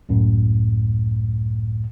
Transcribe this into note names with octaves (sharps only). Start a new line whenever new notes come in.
C#2 F#2 A2